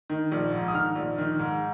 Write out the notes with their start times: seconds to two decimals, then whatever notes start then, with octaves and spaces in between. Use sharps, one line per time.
0.10 D#3
0.32 A#1
0.52 G#2
0.68 D#6
0.74 D#3 F6
0.95 A#1
1.18 D#3
1.39 G#2